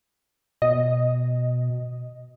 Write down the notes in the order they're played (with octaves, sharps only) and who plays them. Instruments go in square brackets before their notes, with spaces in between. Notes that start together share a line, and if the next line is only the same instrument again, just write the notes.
[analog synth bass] B2 [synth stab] D#5